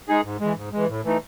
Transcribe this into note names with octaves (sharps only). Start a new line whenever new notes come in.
G#3 D#4 G#4
G#2
E3 G#3
G#2
E3 G#3
A2
E3 A3 D#4